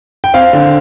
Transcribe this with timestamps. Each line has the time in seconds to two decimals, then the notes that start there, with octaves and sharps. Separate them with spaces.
0.24 G5
0.34 C4 F5
0.53 D3